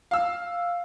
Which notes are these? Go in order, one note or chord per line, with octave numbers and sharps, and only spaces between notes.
F5 E6